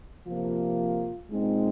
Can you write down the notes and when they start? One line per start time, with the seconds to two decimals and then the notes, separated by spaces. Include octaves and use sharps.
0.26 C3 F3 A#3 F4
1.31 A#2 G#3 C4 D#4